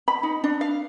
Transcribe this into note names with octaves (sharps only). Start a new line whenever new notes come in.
B5
D#4
D4
F5